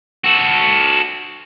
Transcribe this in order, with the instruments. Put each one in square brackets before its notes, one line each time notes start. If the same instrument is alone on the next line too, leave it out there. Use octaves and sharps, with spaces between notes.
[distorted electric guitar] F#4 A4